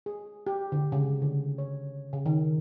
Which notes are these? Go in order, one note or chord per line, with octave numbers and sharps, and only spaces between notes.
G#4
G4
D3
C#3
D3
C#5
C#3
D#3